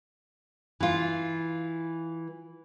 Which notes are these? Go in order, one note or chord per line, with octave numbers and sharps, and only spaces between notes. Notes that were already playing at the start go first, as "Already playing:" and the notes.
E3 F4